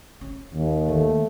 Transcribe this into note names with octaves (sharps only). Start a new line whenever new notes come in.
C#4
D#2
D#3 A3